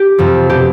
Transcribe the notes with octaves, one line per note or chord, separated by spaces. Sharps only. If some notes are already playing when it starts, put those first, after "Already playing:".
Already playing: G4
F2 C3 F3
B2 G4